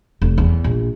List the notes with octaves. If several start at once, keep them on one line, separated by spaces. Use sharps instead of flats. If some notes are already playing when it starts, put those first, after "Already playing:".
F1
E2
A#1